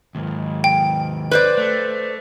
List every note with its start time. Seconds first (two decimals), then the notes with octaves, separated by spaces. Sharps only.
0.15 D#2 G#2
0.64 G5
1.31 B4 C5 D5
1.57 A3